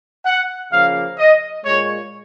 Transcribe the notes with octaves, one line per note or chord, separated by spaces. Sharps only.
F#5
C#3 F3 A#3 F5
D#5
A#2 G#3 C#5